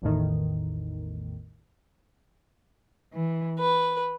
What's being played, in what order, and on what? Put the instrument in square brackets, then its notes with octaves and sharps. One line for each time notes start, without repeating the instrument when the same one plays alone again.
[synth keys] A1 E2 A2 D#3
[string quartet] E3
B4